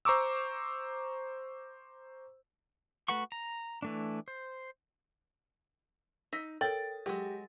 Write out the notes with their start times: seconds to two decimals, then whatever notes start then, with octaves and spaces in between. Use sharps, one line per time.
0.05 C5 A#5 C#6 D6 E6
3.08 A3 F#4 B4 F#5 C#6
3.32 A#5
3.82 E3 A3 D4
4.28 C5
6.33 D#4 E6 A#6 B6
6.61 A4 A#4 C#5 G5 A6
7.06 F#3 G#3 G4